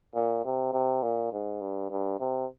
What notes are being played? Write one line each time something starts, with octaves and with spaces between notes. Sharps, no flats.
A#2
C3
C3
A#2
G#2
G2
G2
C3